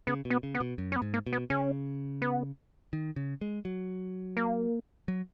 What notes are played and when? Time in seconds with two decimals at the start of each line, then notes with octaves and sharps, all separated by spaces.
0.07 C#3 B3
0.25 B2
0.30 B3
0.43 C#3
0.55 B3
0.60 B2
0.78 F#2
0.92 C#4
0.96 B3
1.02 G#2
1.14 A#3
1.27 B2
1.33 B3
1.50 C#3 C#4
2.22 B3
2.93 D#3
3.16 C#3
3.41 G#3
3.65 F#3
4.37 A#3
5.08 F#3